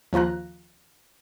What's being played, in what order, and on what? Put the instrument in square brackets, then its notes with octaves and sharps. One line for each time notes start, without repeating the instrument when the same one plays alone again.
[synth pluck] D#2 F3 F4 A#5 F#6